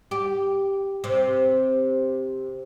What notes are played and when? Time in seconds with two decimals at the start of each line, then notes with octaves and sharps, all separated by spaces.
0.11 G4
1.04 C3